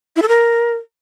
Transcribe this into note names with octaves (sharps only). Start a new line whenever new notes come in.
E4
A4
A#4